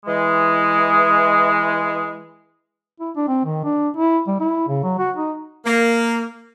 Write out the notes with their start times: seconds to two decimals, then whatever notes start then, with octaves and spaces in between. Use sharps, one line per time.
0.06 E3 G#3
3.00 E4
3.16 D4
3.28 C4
3.45 D#3
3.64 D4
3.97 E4
4.27 G3
4.40 E4
4.68 C#3
4.83 F#3
4.98 F#4
5.16 D#4
5.65 A#3